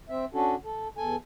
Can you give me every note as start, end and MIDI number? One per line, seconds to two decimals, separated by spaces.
0.09 0.25 60
0.09 0.25 76
0.34 0.55 61
0.34 0.55 62
0.34 0.55 66
0.34 0.55 69
0.64 0.88 69
0.97 1.16 40
0.97 1.16 69
0.97 1.16 80